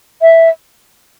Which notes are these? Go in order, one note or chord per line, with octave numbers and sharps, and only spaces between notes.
E5